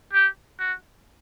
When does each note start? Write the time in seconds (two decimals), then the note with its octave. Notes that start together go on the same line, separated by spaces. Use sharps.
0.13 G4
0.59 F#4